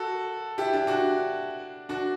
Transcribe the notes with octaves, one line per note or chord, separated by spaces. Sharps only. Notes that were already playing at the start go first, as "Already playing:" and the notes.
Already playing: F#4 A4
E4 G4
D4
D4 F#4
D4 F#4